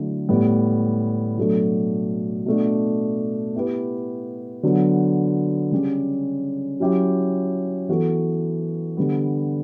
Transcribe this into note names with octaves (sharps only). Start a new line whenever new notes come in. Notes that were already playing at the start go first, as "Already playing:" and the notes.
Already playing: D3 F#3 A3 E4
A2 G3 B3
B2 F#3 A3 D4 A4
B2 A3 D4
B3 E4 G4 B4
D3 F#3 B3
C#3 G3 C#4 G4
F#3 C#4 E4 G4
E3 B3 F#4 A4
D3 G3 B3